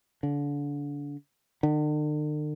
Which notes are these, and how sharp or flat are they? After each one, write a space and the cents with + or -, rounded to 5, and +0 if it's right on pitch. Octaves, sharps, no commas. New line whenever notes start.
D3 -30
D3 +45